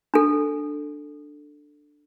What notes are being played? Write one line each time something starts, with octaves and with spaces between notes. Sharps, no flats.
D4 A4